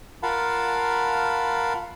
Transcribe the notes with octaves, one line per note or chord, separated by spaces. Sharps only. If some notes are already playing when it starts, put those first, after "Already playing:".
F4 A#4 F5 F#5 A5 B5